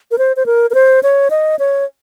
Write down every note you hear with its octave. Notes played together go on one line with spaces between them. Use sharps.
A#4
C5
C5
A#4
A#4
C5
C#5
D#5
C#5